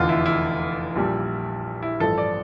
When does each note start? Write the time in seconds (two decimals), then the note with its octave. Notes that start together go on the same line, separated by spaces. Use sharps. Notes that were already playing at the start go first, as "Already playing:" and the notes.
Already playing: F1 E2 D3 F4
0.09 E4
0.26 E4
0.96 A#1 A#2 G3
1.83 E4
2.00 A1 G2 F3 A4
2.18 D5